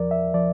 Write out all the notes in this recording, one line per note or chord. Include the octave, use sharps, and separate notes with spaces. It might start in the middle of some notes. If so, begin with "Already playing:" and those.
Already playing: E2 F3 A#4 D5
E5
F3 D5